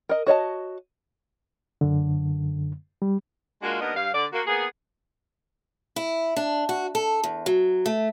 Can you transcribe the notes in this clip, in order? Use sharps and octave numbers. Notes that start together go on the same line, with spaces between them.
A#4 D#5
F#4 C#5 D#5 A5
F#2 D3
G3
G#3 A#3 D4 F4 F#4
D#2 B3 D4 A#4 D#5
G2 F5
D3 D5
A#3 F#4
A#3 B3 G#4
E4
D4
F#4
A4
E2
F#3
A3